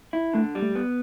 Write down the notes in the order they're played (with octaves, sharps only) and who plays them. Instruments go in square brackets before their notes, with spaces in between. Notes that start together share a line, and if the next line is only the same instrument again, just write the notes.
[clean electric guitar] E4
[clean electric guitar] D3 [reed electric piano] A3
[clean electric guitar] G3
[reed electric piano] A3
[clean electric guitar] B3